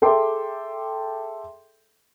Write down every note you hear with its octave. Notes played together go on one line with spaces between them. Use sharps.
G#4 A4 E5 G5 C6 D6